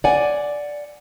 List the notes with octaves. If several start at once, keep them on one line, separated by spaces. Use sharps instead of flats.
D5 F#5 G#5